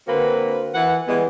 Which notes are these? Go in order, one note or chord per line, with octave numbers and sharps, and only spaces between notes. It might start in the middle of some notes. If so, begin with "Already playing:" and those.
D3 A#3 C4 F#4 B4
E3 F#5
E3 G3 G#3 B3